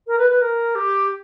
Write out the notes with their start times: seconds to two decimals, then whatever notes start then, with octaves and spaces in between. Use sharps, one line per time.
0.07 A#4
0.18 B4
0.30 B4
0.41 A#4
0.75 G4